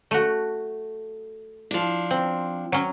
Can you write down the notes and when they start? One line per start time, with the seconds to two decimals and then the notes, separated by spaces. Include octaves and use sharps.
0.11 A3 F#4
1.71 F3 D4
2.11 C4
2.72 F#3 C#4